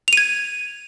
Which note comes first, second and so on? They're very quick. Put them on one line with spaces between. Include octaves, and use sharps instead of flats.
F7 D#7 G#6